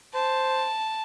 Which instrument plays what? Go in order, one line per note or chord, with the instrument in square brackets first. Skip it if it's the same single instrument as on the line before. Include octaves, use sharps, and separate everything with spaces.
[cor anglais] C5 [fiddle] A5